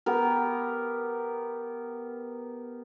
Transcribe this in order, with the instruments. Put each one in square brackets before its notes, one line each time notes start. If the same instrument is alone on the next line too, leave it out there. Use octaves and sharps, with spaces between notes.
[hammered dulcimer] B3 G4 A#4